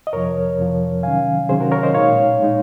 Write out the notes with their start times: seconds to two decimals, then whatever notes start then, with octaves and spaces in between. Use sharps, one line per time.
0.07 D#5
0.13 F2 C3 F3 A#4 C#5
0.58 F2 C3 F3
1.03 C3 D#3 F#3 C#4 F5 G#5
1.49 C3 D#3 F#3 C#4 G#4 C5
1.60 F#4 A#4
1.71 A#4 C#5
1.83 C5 D#5
1.94 A#2 G#3 D#4 C#5 F5
2.40 A#2 G#3 D#4